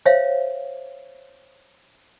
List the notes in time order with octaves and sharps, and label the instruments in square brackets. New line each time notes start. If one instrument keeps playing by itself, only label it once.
[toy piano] C5 C#5 E5 F5